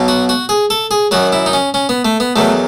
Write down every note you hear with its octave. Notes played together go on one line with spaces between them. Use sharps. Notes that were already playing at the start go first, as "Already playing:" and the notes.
Already playing: B1 B2 F#3
F#4
F#4
G#4
A4
G#4
F#2 D#3 F#3 F#4
E4
D#4
C#4
C#4
B3
A3
B3
E2 D#3 F#3 A3